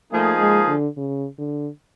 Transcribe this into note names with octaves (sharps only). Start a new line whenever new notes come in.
F3 A3 A#3 D#4 G#4
G#3
D3
C#3
D3